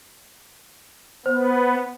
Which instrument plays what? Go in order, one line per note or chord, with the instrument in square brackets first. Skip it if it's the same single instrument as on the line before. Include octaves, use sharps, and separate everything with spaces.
[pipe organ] B3 [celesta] C5